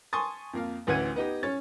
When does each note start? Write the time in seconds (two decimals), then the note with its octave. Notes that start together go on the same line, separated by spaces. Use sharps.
0.13 G#5 A5 C6 C#6 D#6 A6
0.53 F2 A#3 F5
0.87 A1 D2 E3 F#5 G#6 D#7
1.16 B3 D#4 G4
1.43 C#4 C#5 A6